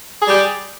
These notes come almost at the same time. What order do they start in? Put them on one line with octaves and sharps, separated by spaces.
G#4 G3 G4